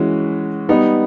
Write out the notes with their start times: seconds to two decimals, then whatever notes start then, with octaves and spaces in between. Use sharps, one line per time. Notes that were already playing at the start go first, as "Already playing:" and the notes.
Already playing: E3 G#3 C#4 F#4
0.69 G3 B3 D#4